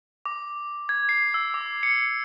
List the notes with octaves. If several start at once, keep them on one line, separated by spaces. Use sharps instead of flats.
D6
G#6
C7
E6
D6
C#7